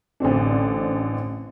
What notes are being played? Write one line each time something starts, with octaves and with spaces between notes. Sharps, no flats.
A1 D3 C4 D4